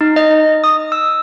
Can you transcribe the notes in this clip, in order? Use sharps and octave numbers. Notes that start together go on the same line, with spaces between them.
D#4
D#5
D#6
E6